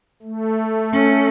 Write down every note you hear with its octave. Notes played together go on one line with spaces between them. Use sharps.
A3
C#4